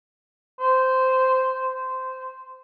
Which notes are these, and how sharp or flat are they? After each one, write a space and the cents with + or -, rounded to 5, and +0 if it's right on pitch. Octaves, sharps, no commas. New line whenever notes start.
C5 -10
C5 -15